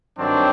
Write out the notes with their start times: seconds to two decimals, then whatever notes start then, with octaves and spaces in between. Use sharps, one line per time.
0.19 G2 D#3 F#3 C4 D4